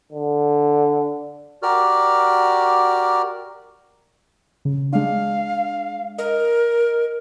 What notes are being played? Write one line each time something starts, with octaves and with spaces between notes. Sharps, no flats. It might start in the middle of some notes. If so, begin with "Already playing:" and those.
D3
F#4 G4 A#4 D5 F6
C#3
G#3 D4 F5
A#4 D#5